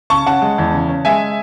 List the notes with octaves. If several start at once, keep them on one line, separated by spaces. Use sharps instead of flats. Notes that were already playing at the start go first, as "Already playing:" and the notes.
C#3 A5 C#6
C#4 F#5 A5
G#3
E2
C#3
C#4
G#3 E5 G#5